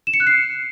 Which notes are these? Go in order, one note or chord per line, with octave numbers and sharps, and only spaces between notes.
E7
C#7
F#6
C7